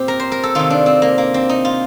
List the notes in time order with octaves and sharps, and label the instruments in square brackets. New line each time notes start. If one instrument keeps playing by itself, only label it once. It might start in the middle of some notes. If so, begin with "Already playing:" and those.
Already playing: [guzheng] A#2 C4 G4
A#4
C5
A#4
A4
C3 D#3 F4
D4
C4
A#3
A#3
C4
D#4
F4